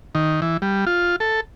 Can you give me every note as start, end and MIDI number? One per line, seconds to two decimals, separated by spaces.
0.15 0.40 51
0.42 0.57 52
0.62 0.85 55
0.87 1.16 65
1.20 1.40 69